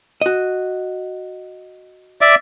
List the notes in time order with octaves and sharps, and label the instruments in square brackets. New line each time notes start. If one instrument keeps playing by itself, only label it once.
[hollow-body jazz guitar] F#4 D#5
[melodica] D5 E5 D6